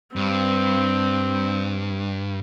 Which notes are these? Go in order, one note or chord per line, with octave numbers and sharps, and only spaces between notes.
G2 C4